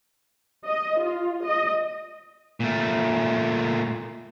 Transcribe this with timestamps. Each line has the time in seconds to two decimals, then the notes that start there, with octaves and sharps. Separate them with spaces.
0.66 D#5
1.00 F4
1.45 D#5
2.60 A#2 A3